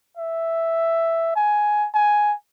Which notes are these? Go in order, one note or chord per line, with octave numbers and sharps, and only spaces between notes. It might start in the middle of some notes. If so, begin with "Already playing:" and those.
E5
G#5
G#5